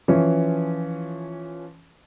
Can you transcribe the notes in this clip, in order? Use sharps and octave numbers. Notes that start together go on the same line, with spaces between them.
E3 F3 C#4